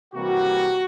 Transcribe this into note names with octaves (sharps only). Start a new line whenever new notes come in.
C3 E3 G3 A#3 F#4